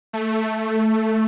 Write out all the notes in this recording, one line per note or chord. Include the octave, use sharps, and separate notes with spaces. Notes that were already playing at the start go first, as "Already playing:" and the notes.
A3